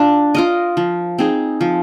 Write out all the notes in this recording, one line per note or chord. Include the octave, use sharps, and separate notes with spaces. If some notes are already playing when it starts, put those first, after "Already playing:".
Already playing: D4 F4
F4 A#4 D#5
F3
C4 D#4 G#4
F3